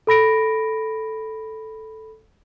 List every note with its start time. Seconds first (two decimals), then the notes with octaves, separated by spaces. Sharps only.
0.07 A4 B5 A#6 D7